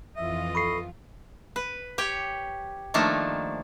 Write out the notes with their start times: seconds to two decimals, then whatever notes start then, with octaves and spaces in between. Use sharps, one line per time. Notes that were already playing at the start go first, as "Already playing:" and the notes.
0.16 F2 E3 F4 D#5 E5
0.55 A4 B5 C#6 C7
1.56 B4
1.98 G4 C#5 G5
2.94 D#3 F3 A3 A#3 D4